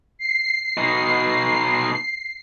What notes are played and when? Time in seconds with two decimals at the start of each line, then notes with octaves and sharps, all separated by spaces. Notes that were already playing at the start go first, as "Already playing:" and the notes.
0.18 C7
0.77 B2 D#4